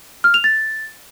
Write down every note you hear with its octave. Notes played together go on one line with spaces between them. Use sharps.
F6
F7
A6